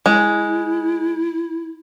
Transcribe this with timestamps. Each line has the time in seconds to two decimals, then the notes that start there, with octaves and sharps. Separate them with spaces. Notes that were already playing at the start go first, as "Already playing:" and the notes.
0.06 G#3 E4